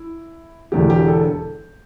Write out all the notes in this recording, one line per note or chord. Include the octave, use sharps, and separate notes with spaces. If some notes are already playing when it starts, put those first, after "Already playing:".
Already playing: E4
E1 E2 D3 G4
G4
A4